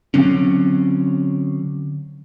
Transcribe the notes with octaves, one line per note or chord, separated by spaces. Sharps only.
D3 F#3 C4 C#4